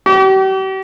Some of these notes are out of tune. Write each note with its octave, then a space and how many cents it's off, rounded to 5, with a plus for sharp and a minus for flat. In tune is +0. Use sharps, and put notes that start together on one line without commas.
G4 -40